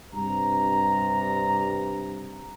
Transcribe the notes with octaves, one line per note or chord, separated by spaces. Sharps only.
G2 C3 A#5